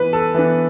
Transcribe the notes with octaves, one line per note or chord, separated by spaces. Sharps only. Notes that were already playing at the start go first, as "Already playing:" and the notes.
Already playing: E3 B3 B4
A4
E3 B3 D4